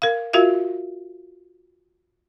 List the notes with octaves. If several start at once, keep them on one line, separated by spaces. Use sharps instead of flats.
A#4 F5
F4 F#4 A#4 E5 F5